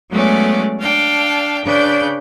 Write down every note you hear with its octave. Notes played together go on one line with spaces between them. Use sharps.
F#3 G#3 A3 B3 C#4 D5
D4 F5 G5 A5
C#3 D4 B4 G6